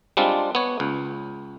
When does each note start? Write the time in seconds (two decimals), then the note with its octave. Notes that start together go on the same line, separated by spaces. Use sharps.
0.17 G3 G#3 C4 D4 F4
0.55 B3 C#5
0.80 C#2